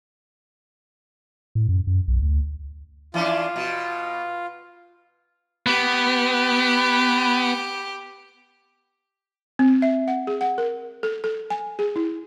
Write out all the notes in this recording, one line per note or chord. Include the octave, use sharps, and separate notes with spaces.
A2
F#2
F#2
B1
D2
E3 C#4 D4 F4
B2
B3 G4
C4
E5
F#5
G#4
F#5
A#4
A4
A4
G#5
G#4
E4